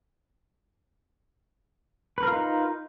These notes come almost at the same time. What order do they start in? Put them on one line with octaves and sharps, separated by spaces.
B4 A#4 F4 D#4